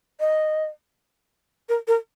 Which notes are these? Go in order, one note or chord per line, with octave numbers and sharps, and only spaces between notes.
D#5
A#4
A#4